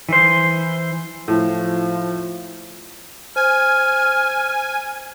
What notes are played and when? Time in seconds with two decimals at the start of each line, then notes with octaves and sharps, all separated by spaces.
0.09 E3 C5
1.28 A2 F3
3.36 C5 G#5 F6